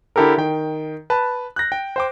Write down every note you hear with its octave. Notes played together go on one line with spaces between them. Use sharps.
D3 E4 G4 A4 A#4
D#3 G5
B4 A5
F#6 G6 A#6
G5
C5 G5 D6